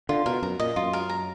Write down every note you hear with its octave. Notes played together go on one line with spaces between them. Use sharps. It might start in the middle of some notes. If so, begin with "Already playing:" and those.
D3 F4
B2 A#4
F#2 A#5
A#2 D#5
F#2 F4
A#4
A#5